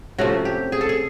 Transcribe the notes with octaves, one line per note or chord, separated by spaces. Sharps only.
C3 F3 A3 C#4 F#4
G4
G#4
A4
G#4